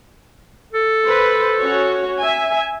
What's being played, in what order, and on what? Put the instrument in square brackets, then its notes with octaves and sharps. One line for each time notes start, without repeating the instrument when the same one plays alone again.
[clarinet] A4
[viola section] B4 C5
C#4 F#4 C#5
E5 G#5